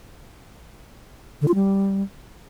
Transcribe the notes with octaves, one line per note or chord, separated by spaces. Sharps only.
D3
F4
G3